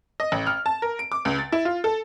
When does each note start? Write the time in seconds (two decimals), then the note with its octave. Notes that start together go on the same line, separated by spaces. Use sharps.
0.20 D#5
0.32 A1
0.47 F6
0.66 A5
0.82 A#4
0.99 D7
1.12 D6
1.25 C#2
1.39 A6
1.52 E4
1.65 F4
1.84 A4